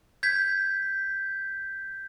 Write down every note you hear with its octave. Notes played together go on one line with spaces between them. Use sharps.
G6 G#6 B6